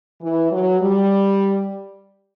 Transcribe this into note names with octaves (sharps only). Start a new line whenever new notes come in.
E3
F#3
G3